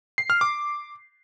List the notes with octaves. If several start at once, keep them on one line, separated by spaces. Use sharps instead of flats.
C7
F6
D6